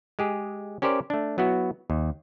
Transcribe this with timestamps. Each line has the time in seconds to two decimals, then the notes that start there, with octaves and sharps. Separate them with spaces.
0.19 G#3 G4 G#4
0.82 C#4 G4 A#4 C5 D5
1.10 A3 D4
1.38 F#3 B3 E4 F#4
1.90 D#2